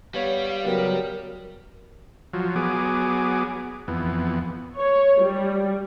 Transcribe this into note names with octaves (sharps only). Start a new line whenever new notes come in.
G3 B3 C#5 F5
C#3 F#3 B3 G4 A#4
F3 F#3
F#3 B3 G#4 D6
F2 E3 B3
C#5
G3